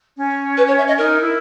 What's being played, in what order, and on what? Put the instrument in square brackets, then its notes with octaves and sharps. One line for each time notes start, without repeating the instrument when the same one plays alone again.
[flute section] C#4
[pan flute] B4
C#5
E5
D#5
[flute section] D#4 [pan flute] A#4
[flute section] E4